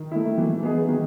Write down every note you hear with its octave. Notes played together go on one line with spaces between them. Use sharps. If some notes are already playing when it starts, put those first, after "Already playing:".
Already playing: D#3
A3 E4
E3
B3 D#4 G#4
D#3